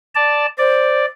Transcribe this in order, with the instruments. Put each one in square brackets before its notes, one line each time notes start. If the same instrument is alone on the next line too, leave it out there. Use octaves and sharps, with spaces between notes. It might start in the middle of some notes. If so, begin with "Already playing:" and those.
[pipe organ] D5 A5
[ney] C5 [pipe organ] D5